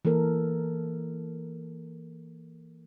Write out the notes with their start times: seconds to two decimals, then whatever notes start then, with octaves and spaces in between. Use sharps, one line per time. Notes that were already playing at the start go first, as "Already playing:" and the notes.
0.05 E3 A#3 A4 A#4